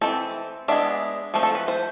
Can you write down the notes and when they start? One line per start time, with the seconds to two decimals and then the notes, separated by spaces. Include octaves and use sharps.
0.01 A3 C4 A4
0.06 E3
0.68 G#3 B3 D4 E5
1.34 F3 A3 C4
1.43 A4
1.55 B4
1.68 C5